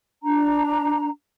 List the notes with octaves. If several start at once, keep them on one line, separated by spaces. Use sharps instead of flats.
D4 A#5